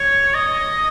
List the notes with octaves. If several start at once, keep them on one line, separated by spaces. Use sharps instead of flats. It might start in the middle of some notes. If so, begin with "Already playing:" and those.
Already playing: C#5
D#5